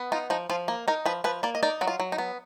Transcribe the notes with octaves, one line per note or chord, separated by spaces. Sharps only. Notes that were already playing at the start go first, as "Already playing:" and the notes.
Already playing: B3
D#4 F4
F3 D#4
F3 F4
A#3
D#4 A#4
F3 B4
F3 B4
A#3 D5
D#5
D#4 D5
F#3 F#4
F4
F#3
D#4
B3